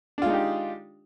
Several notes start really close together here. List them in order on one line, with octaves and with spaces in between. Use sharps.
D4 F4 G#3 D#4 G4